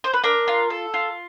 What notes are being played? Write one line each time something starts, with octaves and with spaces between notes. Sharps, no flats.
C5
B4
D4 A#4
F4
A4
F4